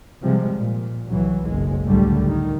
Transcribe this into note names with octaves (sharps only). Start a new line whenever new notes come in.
C3 F3 G3 G#3
A#2
C2 E3 F#3
F#1 B1 G#3
C#2 F#2 A2 D3 G3 A3
D#3